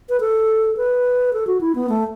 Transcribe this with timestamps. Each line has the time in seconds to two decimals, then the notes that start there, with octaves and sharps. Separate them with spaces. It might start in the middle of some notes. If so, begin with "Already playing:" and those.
0.09 B4
0.20 A4
0.77 B4
1.33 A4
1.47 F#4
1.61 E4
1.75 B3
1.89 A3